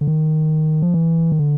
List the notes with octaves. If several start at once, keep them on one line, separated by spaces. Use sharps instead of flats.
D3
D#3
F3
E3
D#3
D3